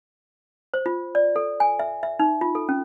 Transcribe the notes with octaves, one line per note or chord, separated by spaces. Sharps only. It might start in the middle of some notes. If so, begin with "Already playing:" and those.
C5
F4
D5
A4
G#5
E5
E5
D#4
F4
A4
C#4